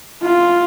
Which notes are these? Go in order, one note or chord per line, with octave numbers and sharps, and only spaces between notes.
F4